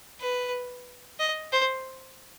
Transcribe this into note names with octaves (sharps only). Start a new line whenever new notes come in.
B4
D#5
C5